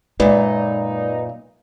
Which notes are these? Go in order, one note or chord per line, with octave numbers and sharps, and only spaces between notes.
F#2 A#2 G#3 D#4 B4 D5